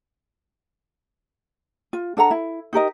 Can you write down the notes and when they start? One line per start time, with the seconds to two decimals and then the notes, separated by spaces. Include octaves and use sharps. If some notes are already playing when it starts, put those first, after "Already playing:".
1.93 F4
2.17 D4 A4 F#5 A#5
2.31 E4
2.73 D#4 G4 A#4 D#5